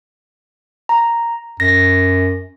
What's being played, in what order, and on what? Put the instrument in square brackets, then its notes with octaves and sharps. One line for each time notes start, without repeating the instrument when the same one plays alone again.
[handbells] A#5
[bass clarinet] F#2 [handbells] A#6